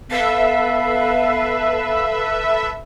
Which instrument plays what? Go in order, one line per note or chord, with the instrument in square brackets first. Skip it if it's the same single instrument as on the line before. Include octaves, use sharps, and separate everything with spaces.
[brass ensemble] B3 [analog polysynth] A4 B4 E5 [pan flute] F5